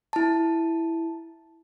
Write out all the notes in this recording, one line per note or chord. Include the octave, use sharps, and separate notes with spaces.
E4 A5